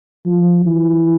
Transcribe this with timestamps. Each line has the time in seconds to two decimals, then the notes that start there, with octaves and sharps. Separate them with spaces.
0.26 F3
0.66 E3